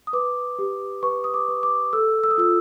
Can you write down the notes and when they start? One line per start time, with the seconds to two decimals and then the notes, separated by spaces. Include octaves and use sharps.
0.07 D#6
0.13 B4 D6
0.59 G4
1.03 B4 C#6
1.24 D#6
1.34 D6
1.48 B4
1.63 D6
1.93 A4 E6
2.24 E6
2.31 D#6
2.38 F4 E6